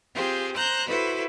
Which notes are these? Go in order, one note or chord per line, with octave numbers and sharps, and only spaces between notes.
C4 F4 G4 G#4
C5 A#5 F#6 G6
E4 F#4 A4 B4 C5